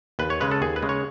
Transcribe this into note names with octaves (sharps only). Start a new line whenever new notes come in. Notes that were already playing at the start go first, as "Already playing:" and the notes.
D#2 B4
C#5
C#3 G#3 B4
A4
D#2 G#4
B4
C#3 G#3
C#5